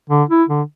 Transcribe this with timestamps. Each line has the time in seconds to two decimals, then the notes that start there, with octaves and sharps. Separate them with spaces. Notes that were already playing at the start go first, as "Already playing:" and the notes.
0.10 D3
0.30 E4
0.48 D3